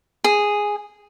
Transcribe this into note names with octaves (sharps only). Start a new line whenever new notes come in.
G#4